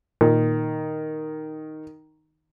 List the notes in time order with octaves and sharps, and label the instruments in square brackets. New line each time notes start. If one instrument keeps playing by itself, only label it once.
[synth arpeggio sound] A#2 [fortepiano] D#3